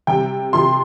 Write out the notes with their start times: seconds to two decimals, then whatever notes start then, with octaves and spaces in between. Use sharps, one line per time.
0.07 C3 G3 G5
0.53 C3 F3 C6